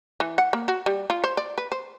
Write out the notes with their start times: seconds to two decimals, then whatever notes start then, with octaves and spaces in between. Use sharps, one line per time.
0.20 E3
0.38 F#5
0.53 A#3
0.68 F#4
0.86 G3
1.10 F4
1.24 C5
1.37 D5
1.58 B4
1.72 C5